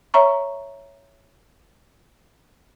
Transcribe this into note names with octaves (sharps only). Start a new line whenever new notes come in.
C#5 E5 A#5 C#6